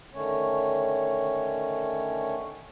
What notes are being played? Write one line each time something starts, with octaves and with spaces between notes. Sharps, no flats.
D3 D#3 A3 C#4 C#5